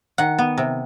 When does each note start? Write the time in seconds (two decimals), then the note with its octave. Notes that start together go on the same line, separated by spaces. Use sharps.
0.18 D#3 F#5
0.39 B3
0.58 C3